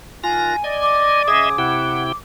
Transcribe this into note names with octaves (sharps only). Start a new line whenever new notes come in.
D#3 F4 G#5 F#6 A#6
D5 D#5 G#5
D6
C#3 G#4 D#5 E5 G#5 D#6
C3 E4 F#5 G5